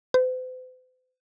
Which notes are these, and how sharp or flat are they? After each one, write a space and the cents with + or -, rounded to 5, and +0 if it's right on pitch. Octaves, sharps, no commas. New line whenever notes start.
C5 -45